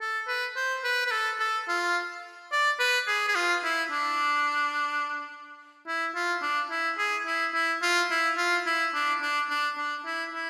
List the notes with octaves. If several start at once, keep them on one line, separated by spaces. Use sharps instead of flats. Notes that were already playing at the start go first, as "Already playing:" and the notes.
A4
B4
C5
B4
B4
A4
A4
F4
D5
B4
G#4
G#4
F4
E4
D4
E4
F4
D4
E4
G#4
E4
E4
F4
E4
F4
E4
D4
D4
D4
D4
E4
E4